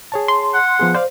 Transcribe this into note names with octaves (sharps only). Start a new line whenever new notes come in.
G#4 C#5 A5
C6
F#5
F3 B3 G#4
C5 D5 F5